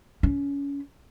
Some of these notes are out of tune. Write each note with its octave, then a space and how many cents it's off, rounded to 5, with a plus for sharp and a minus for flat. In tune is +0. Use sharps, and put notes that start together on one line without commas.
C#4 +25